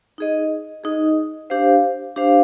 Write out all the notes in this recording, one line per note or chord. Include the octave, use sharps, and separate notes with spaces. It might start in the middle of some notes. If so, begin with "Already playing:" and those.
D#4 G#4 D#5
D#4 G#4 D#5
D4 G4 C5 F5
D4 G4 C5 F5